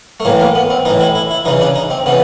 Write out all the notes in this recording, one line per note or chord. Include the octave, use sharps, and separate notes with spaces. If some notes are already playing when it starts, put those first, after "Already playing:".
A3
A2 E3 A#3
A#3
B3
C4
A2 E3 D#4
E4
E4
E4
C#3 E3 D#4
D4
D#4
C4
C#3 E3 B3